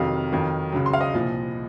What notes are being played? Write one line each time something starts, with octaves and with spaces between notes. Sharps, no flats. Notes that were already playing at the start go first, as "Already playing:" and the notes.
Already playing: F2 C3 D#3 F#3 F5
F2 D#3 F#3
C#2 C#3 F#3
C6
F5
D#5
C2 A#2 F3